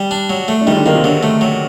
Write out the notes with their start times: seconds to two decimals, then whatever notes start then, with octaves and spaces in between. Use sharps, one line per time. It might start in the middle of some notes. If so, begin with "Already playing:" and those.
Already playing: G3
0.11 D4
0.30 F#3
0.48 A3
0.61 D4
0.67 D#3 G3 D#4
0.76 D3 D4
0.86 D#3 A#3 D#4
0.94 C3 C4
1.04 D3 F#3 D4
1.23 A3
1.41 F#3